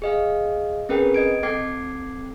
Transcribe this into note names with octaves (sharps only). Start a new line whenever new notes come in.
G#4 D#5 F5
C4 C#4 G#4 A#4 B4 G5
D#5 G#6 D7
C4 A4 G5 D6 G#6 C7